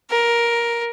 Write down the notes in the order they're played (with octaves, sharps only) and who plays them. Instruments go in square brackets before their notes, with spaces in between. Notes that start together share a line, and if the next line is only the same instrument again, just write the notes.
[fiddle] A#4